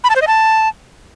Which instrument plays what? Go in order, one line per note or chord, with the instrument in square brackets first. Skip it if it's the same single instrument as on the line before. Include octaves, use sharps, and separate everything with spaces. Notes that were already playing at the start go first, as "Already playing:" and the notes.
[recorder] B5
A5
C5
D#5
A5